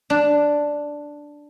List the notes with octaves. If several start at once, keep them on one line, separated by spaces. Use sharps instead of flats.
D4